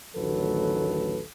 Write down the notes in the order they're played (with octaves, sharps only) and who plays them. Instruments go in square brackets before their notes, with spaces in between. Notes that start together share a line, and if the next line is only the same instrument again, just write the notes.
[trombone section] A1 D2 D#3 F#3 A4 B4